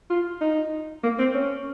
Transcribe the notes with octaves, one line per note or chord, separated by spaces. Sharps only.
F4
D#4
A#3
C4
C#4